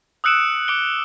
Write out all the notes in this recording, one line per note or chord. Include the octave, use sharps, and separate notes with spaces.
D#6 E6 F#6 C#7 D7 E7
D6 C#7 D7 G7